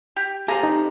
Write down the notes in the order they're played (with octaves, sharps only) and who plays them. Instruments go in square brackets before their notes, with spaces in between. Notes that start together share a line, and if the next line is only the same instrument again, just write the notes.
[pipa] G4
[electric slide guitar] G4 A4 C5 [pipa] F5 G#5 A#5
[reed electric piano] D#4